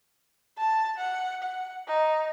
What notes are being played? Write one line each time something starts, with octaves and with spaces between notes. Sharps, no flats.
A5
F#5
F#5
D#4